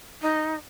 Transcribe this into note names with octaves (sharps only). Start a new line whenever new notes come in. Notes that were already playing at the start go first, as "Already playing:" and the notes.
D#4